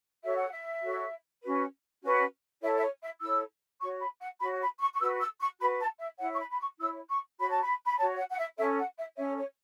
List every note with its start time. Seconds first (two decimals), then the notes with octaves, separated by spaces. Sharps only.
0.23 F#4 A4 C#5 E5
0.36 F#5
0.50 E5
0.83 F#4 A4 C#5
1.42 C#4 F#4 B4
2.02 C#4 F#4 B4
2.62 E4 A4 C#5 E5
2.75 E5
2.81 C#5
3.01 E5
3.21 E4 A4 C#5 E6
3.81 F#4 C#5 C#6
4.00 B5
4.21 F#5
4.40 F#4 C#5 B5
4.61 B5
4.80 C#6
4.94 C#6
4.99 F#4 B4 E6
5.20 E6
5.40 C#6
5.59 F#4 B4 B5
5.79 A5
5.99 E5
6.19 E4 C#5 F#5
6.34 C#6
6.39 B5
6.50 B5
6.59 C#6
6.79 E4 C#5 E6
7.09 C#6
7.38 F#4 C#5 B5
7.50 A5
7.62 B5
7.86 B5
7.98 F#4 C#5 A5
8.17 F#5
8.30 F#5
8.38 E5
8.57 C#4 A4 C#5 E5
8.78 F#5
8.97 E5
9.17 C#4 A4 C#5 E5
9.37 C#5